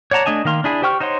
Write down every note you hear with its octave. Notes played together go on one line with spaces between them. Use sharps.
C#5 D5 F#5 A5 A#5
A3 D4 D#5 G#5 A5
D#3 A#3 F5 C6
D4 E4 G#4
G4 C5 G5 C#6 F6
D#4 C5 C#5 F#5 C6